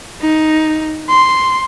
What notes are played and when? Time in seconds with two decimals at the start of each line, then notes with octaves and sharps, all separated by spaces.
0.21 D#4
1.09 C6